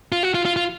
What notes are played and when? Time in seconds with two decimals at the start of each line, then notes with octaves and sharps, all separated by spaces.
0.12 F4
0.23 F#4
0.35 F4
0.45 F4
0.56 F4